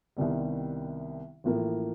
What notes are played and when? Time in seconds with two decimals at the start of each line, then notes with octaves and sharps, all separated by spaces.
0.17 C2 C3 D#3 G3 B3
1.44 A1 A2 F3 A#3